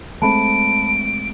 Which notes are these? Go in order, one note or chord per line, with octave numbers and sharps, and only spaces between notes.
G#3 A3 C4 A5 B5 D7